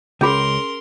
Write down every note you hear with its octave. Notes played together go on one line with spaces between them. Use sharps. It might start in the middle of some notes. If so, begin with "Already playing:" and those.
C#2 C#4 G#4 A#4 B5 C6